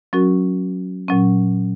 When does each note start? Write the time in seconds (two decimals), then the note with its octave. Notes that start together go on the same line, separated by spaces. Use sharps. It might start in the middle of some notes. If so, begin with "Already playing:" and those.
0.13 F#3 C#4 F#4 A#4
1.08 A#2 F#3 C#4